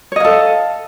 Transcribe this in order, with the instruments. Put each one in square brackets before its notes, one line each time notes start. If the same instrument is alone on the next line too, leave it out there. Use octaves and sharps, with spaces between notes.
[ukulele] C#5
D#5
F5
A4